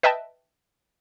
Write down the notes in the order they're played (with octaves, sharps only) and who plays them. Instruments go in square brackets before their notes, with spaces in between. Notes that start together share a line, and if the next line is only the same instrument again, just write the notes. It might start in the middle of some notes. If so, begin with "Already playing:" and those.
[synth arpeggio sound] B4 D#5 E5 G5 A5